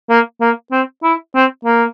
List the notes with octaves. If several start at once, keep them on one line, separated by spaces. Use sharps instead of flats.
A#3
A#3
C4
E4
C4
A#3